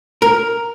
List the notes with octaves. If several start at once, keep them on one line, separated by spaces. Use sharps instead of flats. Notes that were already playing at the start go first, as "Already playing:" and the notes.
A#4